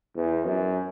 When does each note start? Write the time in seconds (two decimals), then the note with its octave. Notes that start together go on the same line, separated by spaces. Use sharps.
0.16 E2
0.46 F#2